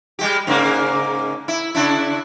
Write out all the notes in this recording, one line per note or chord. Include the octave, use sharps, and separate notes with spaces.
G3 G#3 G4
G#2 C#3 A#3
E4
C#3 D4 E4